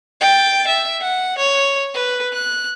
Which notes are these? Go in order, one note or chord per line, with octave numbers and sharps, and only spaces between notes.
G5 A6
E5
F#5
C#5
B4
F#6